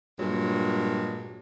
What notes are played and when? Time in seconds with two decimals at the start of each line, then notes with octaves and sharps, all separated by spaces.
0.18 G2 A#2 F#3 G#3